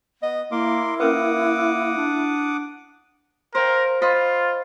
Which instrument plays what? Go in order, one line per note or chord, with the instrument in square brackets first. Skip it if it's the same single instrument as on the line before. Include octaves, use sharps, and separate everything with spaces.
[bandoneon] B3 [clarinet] D#5
[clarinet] A#3 [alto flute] E4 [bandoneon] A#4 C6 D6
[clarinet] A#3 [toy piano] C#4 A#4 B4 [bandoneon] F#5 D6 D#6
[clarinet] D4
[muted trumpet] A#4 [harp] C5 F5 G5
[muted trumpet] F4 [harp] C5 D#5 B5